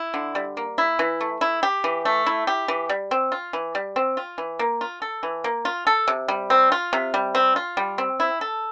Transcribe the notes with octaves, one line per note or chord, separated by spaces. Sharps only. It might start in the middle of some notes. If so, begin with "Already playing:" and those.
Already playing: E4
D3
G3
A#3
E4
E3
A3
E4
G4
E3
A3
E4
G4
E3
G3
C4
F4
E3
G3
C4
F4
E3
A#3
F4
A4
E3
A#3
F4
A4
C3
G3
C4
F4
C3
G3
C4
F4
G3
C4
E4
A4